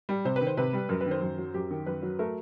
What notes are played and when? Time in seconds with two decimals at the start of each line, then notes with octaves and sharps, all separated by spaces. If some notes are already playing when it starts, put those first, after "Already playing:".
0.09 G3
0.25 C3 C5
0.36 B4
0.41 D#3
0.47 C5
0.57 C3 B4
0.73 G3
0.89 F#2 A#4
1.01 B4
1.06 D#3
1.11 C5
1.22 F#2
1.38 F#3
1.54 F#2 G4
1.71 D#3
1.86 F#2 B4
2.03 F#3
2.19 A3 A#4